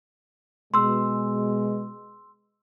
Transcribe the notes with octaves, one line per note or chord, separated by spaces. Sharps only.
B2 G#3 C6 E6